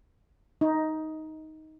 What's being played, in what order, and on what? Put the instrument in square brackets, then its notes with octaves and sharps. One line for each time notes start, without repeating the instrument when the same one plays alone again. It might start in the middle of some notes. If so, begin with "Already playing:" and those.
[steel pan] D#4